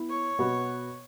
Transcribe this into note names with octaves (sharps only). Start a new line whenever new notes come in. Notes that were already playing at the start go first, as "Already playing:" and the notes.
Already playing: B3 E4
C#5
B2 B3 F#4 B4